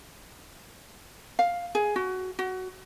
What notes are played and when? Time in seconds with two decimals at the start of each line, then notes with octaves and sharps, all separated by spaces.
1.39 F5
1.75 G#4
1.96 F#4
2.39 F#4